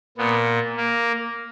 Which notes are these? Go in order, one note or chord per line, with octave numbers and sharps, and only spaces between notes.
A#2 B3
A#3